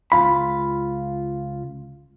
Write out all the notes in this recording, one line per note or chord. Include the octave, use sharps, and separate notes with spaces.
C#2 F#2 F4 B5